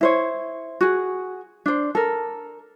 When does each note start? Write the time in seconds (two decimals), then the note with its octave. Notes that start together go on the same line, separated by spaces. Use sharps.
0.01 E4 C5 C#5
0.81 F#4 G#4
1.66 D4 C5
1.95 A4 A#4